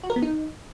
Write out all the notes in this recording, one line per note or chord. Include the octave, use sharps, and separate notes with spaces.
F#4
A#4
B3
D#4